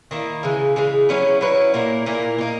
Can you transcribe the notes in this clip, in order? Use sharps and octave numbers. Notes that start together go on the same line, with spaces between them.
D#3 A#3 E4
C#3 E3 G#3
C#3 E3 G#3
F#3 C#4 E4 B4
F#3 C#4 E4 B4
A#2 A#3 E4 A#4
A#2 A#3 E4 A#4
A#3 D#4 A#4